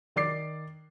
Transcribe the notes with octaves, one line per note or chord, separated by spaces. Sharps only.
D#3 D5 D6 C7